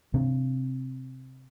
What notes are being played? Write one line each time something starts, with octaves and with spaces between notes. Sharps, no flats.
C3 C4 D4